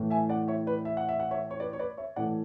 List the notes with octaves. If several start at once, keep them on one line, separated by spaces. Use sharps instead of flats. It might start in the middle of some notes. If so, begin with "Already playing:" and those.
Already playing: A2 E3 A3
E5 G#5
D5 F#5
C#5 E5
B4 D5
E5
F#5
E5
F#5
C#5 E5
C#5
B4 D5
C#5
B4 D5
C#5 E5
A2 E3 A3 D5 F#5